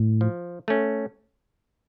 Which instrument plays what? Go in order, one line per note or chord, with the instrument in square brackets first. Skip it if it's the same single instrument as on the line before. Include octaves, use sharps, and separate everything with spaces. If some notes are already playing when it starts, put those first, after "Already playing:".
Already playing: [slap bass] A2
[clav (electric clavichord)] F3
A3 C#4